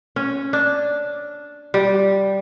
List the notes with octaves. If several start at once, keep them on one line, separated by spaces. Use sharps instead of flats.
C#4
D4
G3